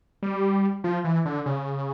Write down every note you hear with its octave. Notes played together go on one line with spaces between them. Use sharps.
G3
F3
E3
D3
C#3